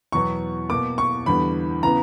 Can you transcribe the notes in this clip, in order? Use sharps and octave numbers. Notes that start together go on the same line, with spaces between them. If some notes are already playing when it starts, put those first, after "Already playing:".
E2 B2 F#3 B3 C#6
B2 A#3 D6
C#6
E2 D3 G3 B3 B5
C#3 E3 B3 A#5